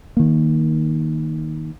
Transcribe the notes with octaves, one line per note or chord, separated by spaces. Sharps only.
D#3 A#3